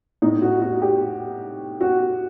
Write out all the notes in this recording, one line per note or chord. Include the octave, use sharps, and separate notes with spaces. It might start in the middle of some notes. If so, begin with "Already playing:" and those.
A2 D#4
F#4
F#4
G4
F#4